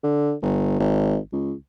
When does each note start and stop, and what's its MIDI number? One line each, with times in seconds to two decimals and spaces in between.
0.04 0.33 50
0.42 0.76 31
0.80 1.17 32
1.32 1.53 37